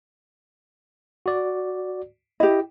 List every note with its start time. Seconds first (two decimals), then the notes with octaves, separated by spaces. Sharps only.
1.26 F#4 D5
2.40 E4 G4 D#5